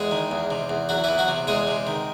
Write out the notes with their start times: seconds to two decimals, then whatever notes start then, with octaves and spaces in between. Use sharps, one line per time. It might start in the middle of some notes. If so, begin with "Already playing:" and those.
Already playing: E2 G#3 G#4
0.11 D#3
0.31 E2
0.50 C3
0.69 E2
0.89 E2 F#3 F#4
1.04 E2 E3 E4
1.18 F#3 F#4
1.28 C3
1.47 E2 G#3 G#4
1.67 C3
1.87 D#3